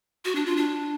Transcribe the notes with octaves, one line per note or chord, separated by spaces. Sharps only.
F#4
D4
F4
D4